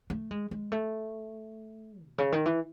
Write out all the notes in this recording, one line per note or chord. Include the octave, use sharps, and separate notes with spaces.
A3
G#3
G#3
A3
B2
C#3
D#3
E3